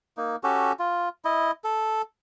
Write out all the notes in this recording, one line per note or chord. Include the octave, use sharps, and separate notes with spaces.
A#3 D#4
C#4 F#4 G4 A4
F4
E4 D#5
A4